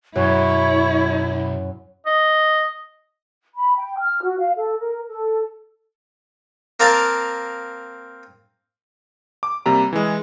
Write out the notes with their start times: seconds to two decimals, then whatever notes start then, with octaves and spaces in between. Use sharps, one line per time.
0.16 B1 F#2 E4 C#5
2.06 D#5
3.55 B5
3.76 G5
3.98 F6
4.23 F#4
4.40 F5
4.57 A4
4.80 A#4
5.08 A4
6.80 A#3 C4 A#4 F5 A5
9.43 D6
9.66 C3 G3 A#3 A#5
9.93 E3 G#3